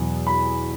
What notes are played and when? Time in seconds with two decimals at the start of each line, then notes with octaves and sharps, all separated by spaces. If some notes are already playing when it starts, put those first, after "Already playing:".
Already playing: E2 B2 F#3
0.27 B5